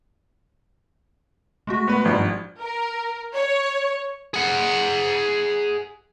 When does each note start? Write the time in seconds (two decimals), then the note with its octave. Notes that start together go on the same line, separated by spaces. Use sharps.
1.67 G#3 A3 F#4
1.88 B3 B4
2.05 G#1 G2 F3
2.60 A#4
3.33 C#5
4.34 G#4 F#5